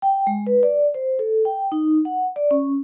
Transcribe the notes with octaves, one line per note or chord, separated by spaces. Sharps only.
G5
G#3
B4
D5
C5
A4
G5
D#4
F#5
D5
C#4